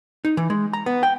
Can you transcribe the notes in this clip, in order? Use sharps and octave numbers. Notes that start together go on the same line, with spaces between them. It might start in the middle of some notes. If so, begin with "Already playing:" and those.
D#4
E3
G#3
A#5
B3
G5